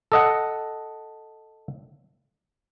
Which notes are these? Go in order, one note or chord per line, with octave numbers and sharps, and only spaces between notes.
A4 D#5 F#5